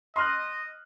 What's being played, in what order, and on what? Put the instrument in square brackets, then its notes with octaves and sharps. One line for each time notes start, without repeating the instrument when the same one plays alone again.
[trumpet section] D#5 [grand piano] C6 F6 F#6